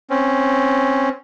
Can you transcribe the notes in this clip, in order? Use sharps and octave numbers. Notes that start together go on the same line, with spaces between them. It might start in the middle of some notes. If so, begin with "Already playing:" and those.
C4 C#4